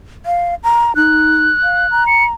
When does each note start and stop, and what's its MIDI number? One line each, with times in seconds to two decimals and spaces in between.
0.26 0.55 77
0.64 0.95 82
0.96 1.47 63
0.96 2.04 90
1.63 1.87 77
1.91 2.32 82
2.07 2.24 97